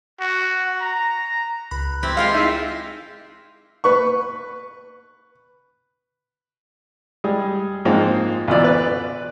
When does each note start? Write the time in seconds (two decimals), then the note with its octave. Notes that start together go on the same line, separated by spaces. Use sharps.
0.20 F#4
0.81 A#5
1.71 C#2 B5 F#6
2.03 C4 E4 G4
2.17 G#3 F4 G4 F5 A#6
2.35 D#4 E4 G#4 E5
3.84 B4 C#6
7.24 G3 G#3 G#4
7.85 G#2 F3 G#3 A#3 C4 D#4
8.48 A1 D2 B2 F4 D5 E6
8.64 B4 D5